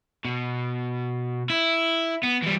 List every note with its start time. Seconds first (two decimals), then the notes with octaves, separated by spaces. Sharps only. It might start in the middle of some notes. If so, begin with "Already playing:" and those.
0.25 B2
1.50 E4
2.23 B3
2.42 E3 G3